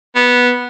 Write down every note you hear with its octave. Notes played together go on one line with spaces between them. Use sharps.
B3